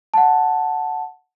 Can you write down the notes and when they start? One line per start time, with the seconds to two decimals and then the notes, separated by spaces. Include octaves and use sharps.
0.14 F#5 A5